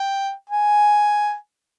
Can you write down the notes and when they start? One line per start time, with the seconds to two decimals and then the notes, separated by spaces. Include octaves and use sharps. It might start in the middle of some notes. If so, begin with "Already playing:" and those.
Already playing: G5
0.49 G#5